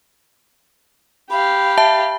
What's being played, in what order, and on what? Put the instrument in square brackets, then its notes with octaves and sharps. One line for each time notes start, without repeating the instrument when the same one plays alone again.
[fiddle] G4 F5 [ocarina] B5
[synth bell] E5 A5